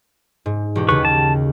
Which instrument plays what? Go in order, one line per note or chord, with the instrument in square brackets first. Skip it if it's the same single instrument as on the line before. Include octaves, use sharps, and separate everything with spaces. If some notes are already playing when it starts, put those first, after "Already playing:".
[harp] G#2
E1 F#4 G4
[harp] D#2 C#3 [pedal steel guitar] B4 C#6
[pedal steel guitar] A5